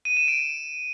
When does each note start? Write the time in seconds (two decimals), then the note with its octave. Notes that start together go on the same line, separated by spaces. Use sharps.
0.05 D#7
0.17 E7
0.28 D7